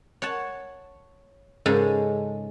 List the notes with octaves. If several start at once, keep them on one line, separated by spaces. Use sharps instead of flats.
C#5 F#5 A5
G#2 C#3 G#3 A4